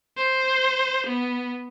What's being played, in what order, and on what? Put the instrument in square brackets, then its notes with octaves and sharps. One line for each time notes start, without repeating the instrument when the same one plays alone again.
[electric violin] C5
B3